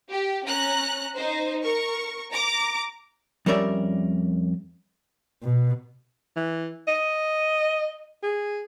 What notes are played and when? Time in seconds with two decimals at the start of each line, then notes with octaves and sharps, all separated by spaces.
0.10 G4
0.45 C#4 A#5 F#6
1.16 D#4 C5
1.64 A#4 C#6
2.32 A#5 D6
3.46 F2 G3 C#4 A#4 D5 E5
5.43 B2
6.36 E3
6.88 D#5
8.23 G#4